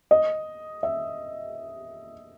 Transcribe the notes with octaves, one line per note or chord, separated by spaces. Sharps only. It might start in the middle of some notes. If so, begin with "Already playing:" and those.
D#5
E5